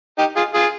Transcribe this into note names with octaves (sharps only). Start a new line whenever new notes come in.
D#4 G4
F4 G#4
F4 G#4